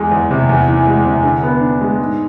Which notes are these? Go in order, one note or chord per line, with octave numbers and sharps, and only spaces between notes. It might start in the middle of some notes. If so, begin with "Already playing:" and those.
Already playing: E2 G#3
E2
C3
E2
E3
G#3
C3
D3
B3
D4
G#3
G#2